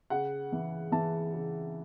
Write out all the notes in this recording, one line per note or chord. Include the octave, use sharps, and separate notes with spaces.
C#3 F#5
E3
E3 A5
C#3